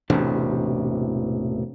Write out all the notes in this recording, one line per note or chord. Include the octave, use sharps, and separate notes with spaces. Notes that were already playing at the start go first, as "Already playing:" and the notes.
E1 A1 C3 D4